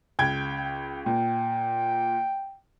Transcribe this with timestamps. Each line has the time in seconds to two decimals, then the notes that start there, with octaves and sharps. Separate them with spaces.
0.19 C#2 G5 G#6
1.06 A#2 G5